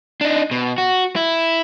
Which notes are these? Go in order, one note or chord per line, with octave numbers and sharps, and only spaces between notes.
D4 D#4
B2
F#4
E4